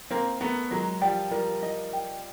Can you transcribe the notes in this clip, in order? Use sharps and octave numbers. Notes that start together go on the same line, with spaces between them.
A#3 C4 A#4
A3 B3 A#4
F#3 G#3 A#4
F3 G3 G5
F3 G3 A#4
D#5
G5